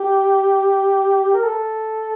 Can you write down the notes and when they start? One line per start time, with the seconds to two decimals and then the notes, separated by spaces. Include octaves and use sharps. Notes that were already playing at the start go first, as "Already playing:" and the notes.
Already playing: G4
1.34 A#4
1.44 A4